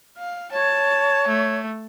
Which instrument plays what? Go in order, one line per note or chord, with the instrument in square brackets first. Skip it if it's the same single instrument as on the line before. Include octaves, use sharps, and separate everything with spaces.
[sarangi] F5
[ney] C#5 [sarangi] A5
[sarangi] A3